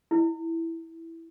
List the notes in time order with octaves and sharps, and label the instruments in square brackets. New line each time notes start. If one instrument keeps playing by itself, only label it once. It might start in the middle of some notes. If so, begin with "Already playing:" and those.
[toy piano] E4